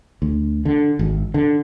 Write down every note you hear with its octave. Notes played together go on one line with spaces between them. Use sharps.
D2
D3
G#1
D3